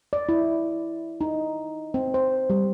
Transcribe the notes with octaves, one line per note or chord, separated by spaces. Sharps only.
D5
E4
D#4
C4
C5
G3